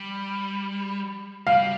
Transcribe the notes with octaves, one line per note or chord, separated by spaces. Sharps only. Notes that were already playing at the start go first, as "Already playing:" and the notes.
Already playing: G3
G3 F5